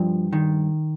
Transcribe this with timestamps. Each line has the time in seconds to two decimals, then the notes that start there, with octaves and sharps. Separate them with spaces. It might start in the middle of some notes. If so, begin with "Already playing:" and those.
Already playing: G2 F3
0.33 D#3